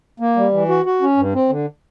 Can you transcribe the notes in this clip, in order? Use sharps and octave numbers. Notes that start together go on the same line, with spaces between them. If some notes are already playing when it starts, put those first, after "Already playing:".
A#3
G3
E3
F#4
F#4
C#4
G2
C4
D3